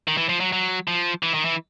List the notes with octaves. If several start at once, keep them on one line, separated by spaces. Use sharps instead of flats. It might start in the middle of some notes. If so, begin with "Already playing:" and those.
D#3
E3
F3
F#3
F#3
F3
E3
D#3
E3